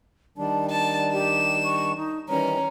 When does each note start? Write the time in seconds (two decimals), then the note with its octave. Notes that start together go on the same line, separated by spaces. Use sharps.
0.38 D#3 G3 D4 A5
0.70 D5 A5
1.13 G4 E7
1.64 C#6
1.97 D#4
2.29 D#3 E3 G3 C#4 A#5